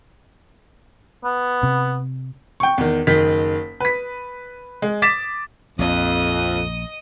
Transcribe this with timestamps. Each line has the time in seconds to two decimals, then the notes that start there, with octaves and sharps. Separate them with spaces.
1.24 B3
1.63 C3
2.60 G5 C#6
2.78 E2 D#3
3.07 F#1 D#3 B6
3.80 B4 B6
4.82 G#3
5.02 D6 A6 B6 E7
5.79 A#1 F2 D#5